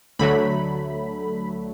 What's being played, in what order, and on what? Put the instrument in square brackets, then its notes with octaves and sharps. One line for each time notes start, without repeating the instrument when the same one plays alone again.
[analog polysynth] D2 D3 F#3 A3 B5